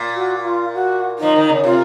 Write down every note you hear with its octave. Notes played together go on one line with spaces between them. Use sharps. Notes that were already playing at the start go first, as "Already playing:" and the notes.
Already playing: A#2
F#4
F4
F#4
F3 D#4
D#3
C#3
C3 F4